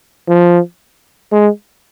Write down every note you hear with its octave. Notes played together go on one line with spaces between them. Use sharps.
F3
G#3